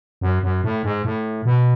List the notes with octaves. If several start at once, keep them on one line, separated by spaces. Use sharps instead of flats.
F#2
F#2
A2
G#2
A2
B2